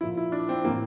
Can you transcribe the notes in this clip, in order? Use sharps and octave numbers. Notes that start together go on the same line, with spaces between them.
A#2 F3 E4
E4
D4
C4
A2 E3 A#3